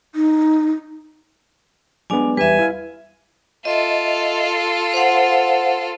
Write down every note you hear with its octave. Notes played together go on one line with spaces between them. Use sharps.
D#4
F#3 G#3 B3 D4 D5 G#5
E2 G3 B4 E5 G#5
E4 F5
F4 A4 D#5 E5
C5 F5 F#5